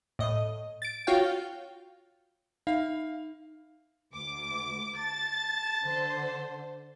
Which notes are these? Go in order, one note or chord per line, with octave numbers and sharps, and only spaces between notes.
A2 D#5
A6 D7
F4 F#4 C#5 F5 G5
D#4 E5 F5
D2 D6
A5 A6
D3 C5